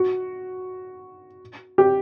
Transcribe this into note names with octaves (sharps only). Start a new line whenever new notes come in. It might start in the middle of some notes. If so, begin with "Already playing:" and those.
Already playing: F#4
G4